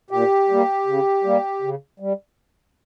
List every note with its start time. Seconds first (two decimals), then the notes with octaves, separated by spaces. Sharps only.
0.11 A#2 G4
0.49 G3 A#3
0.86 C#3
1.24 G3 A#3
1.62 C#3
2.00 G3